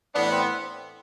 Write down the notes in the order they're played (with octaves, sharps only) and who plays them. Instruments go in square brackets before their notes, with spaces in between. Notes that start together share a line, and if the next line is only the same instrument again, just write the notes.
[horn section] A2 E3 B3 [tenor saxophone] D4
[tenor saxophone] C4